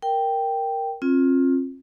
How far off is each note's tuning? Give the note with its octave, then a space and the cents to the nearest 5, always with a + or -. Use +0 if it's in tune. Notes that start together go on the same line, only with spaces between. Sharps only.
A#4 +0 G5 +0
C4 +40 F4 +10